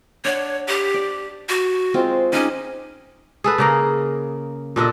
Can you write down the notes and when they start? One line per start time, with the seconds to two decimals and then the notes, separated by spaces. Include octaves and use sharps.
0.25 D4 C#5 F#5
0.68 G4
0.94 D5
1.49 F#4
1.94 G#3 C4 F4
2.33 C#4 D#4 G#4 D6
3.44 G#4 A4 B4
3.58 C#3 A#3 A#4
4.76 A#2 D4 A4 D#5